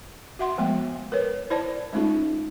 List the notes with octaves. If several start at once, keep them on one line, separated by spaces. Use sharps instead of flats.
F#4 E5 F#5 C6
F3 G#3 A3 B3 G5
A#4 B4 C#5
E4 C5 D5 A5
G#3 A3 C#4 D#4 F4 G#4